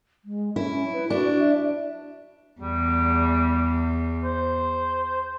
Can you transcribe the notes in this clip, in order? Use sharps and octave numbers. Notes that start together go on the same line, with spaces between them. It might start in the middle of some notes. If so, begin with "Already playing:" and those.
G#3
C#4 E4
B4
D4 F#4
E5
E2 G3
C5